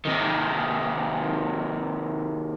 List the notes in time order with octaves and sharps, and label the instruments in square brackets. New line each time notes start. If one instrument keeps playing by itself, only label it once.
[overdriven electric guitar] C3 D#3